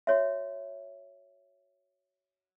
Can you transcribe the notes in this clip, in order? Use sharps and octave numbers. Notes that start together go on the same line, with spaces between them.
F#4 C#5 E5